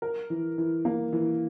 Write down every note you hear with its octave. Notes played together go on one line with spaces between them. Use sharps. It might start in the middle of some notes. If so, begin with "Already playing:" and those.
A#4
E3
E3
A#3
E3